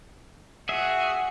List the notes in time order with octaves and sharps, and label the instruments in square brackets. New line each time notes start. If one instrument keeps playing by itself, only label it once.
[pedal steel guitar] F#4 E5 [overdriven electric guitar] G#4 [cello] F#5